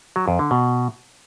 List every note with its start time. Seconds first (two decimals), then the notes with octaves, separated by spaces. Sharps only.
0.16 F#3
0.28 F2
0.39 D3
0.51 B2